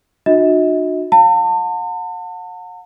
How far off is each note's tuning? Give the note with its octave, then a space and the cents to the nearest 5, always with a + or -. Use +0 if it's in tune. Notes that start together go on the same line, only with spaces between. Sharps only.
D4 +45 F#4 -35 D#5 +45
F#5 -40 A5 +40